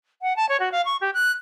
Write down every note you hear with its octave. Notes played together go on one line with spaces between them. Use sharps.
F#5
A5
C#5
F#4
F5
C#6
G4
F#6